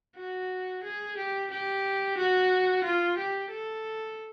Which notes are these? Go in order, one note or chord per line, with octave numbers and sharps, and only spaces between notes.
F#4
G#4
G4
G4
F#4
F4
G4
A4